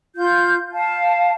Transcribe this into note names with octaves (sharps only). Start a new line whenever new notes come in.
F4 G6
F5 A5